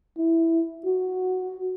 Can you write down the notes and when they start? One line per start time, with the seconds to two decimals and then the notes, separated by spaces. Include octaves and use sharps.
0.18 E4
0.86 F#4